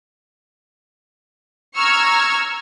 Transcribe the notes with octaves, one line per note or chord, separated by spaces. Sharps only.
A#5 C#6 E6 F6 G#6